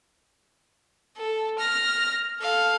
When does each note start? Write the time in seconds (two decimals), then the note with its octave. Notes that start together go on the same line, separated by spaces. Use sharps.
1.17 A4
1.59 F6 A#6
2.40 A4 F5